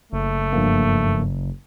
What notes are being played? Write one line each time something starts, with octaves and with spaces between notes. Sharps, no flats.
F#1 A3
G2 F3 A#3